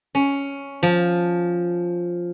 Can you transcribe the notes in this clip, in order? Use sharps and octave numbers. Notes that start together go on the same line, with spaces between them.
C#4
F3